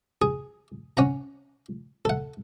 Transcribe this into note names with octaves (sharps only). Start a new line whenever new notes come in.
G#4
C#4 F#5 A#5
A4 F#5